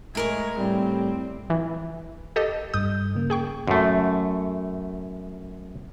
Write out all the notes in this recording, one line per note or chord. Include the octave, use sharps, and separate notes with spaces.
A2 G#3 E4 A#4 C#6
A2 G3 C4
E3
G4 A4 D#5
G2 D#6 G6
C#3 A#3
G#4 G5 C#6
F#2 A3